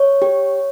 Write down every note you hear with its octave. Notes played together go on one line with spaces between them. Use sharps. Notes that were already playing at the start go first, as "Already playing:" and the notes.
Already playing: C#5
G4